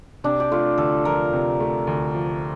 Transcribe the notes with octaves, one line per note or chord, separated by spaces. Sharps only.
C3 D4
G4
A3 F4
D2 A4
F3 A#4
C3
A3
D2
F3